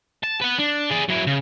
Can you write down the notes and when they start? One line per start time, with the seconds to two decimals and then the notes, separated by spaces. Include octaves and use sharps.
0.23 A5
0.41 B4 F#5
0.58 D4
0.90 G#4 D5
1.08 F#3 E4
1.27 C#3